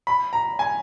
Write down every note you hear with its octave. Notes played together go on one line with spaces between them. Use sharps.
B5
A#5
G#5